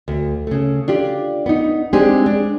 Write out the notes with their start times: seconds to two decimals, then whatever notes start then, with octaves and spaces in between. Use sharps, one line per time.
0.08 D2
0.47 C#3 A3
0.88 D4 F4 G4
1.46 B3 D#4
1.93 G#3 C4 D4 D#4 G4 G#4
2.26 D4